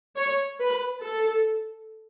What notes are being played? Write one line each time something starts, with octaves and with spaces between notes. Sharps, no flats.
C#5
B4
A4